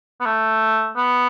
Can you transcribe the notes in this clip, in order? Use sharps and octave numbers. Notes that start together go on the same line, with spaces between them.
B3
A3
B3